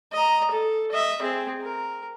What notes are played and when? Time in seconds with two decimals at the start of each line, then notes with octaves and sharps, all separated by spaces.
0.13 D#5 A#5
0.52 A4
0.92 D#5 E5
1.22 C4 G#4
1.62 A#4